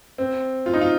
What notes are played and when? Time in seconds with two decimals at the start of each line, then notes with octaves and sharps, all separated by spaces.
0.18 C4
0.66 F4
0.74 D#4
0.81 F4